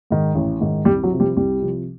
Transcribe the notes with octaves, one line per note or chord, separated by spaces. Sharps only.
G#2 D#3
A1
G#2 D#3
C2 G3
F#3
C3 F3
G3
C2 G3
C3 F3